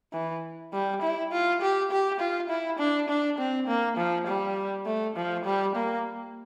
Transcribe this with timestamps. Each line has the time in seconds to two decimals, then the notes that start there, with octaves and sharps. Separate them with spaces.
0.13 E3
0.73 G3
1.02 E4
1.32 F4
1.61 G4
1.91 G4
2.20 F4
2.49 E4
2.79 D4
3.09 D4
3.38 C4
3.67 A#3
3.97 F3
4.27 G3
4.86 A3
5.16 F3
5.45 G3
5.75 A#3